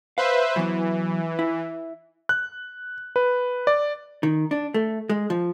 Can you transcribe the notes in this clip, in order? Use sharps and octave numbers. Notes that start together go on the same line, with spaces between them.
B4 C5 E5 F5
E3 F#3 B3
E4
F#6
B4
D5
D#3
D4
A3
G#3
F3